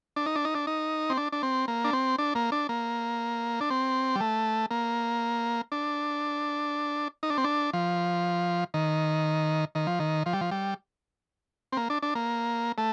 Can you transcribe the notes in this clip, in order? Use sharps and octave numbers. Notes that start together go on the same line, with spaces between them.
D4
D#4
D4
D#4
D4
D#4
C4
D4
D4
C4
A#3
D4
C4
D4
A#3
D4
A#3
D4
C4
G3
A3
A#3
D4
D#4
D4
C4
D4
F3
D#3
D#3
F3
D#3
F3
G3
F3
G3
C4
A#3
D4
D4
A#3
A3